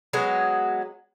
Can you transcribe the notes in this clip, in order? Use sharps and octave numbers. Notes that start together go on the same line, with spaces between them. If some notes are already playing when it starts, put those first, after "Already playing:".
F#3 G#3 B3